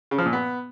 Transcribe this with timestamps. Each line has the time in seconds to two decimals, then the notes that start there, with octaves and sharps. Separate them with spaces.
0.11 C#3
0.18 F3
0.26 A#2
0.33 B3